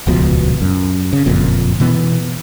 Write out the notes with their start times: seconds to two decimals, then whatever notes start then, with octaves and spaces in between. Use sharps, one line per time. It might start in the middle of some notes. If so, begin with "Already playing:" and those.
0.07 D#1 C#2 B2 F3
0.62 F#2
1.13 C#3
1.26 F#1 F2 A#2
1.80 B2 E3 B3